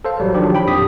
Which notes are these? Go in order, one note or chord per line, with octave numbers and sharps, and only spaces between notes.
A4 C5 F5
A1 F#3 G3
D#3 F3 F#3 D4 G4
G5 B5
F2 A#2 G4 D#6 B6